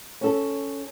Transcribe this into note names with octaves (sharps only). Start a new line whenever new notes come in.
C#4 A4